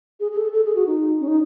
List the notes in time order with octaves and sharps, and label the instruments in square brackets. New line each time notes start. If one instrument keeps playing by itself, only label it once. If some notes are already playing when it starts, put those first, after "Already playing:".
[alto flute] G#4
G#4
A4
A4
G#4
F#4
D#4
C#4
D#4